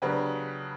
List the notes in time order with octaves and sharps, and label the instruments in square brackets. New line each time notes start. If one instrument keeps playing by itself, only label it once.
[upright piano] C#3 F#3 B3 D4 G4 B4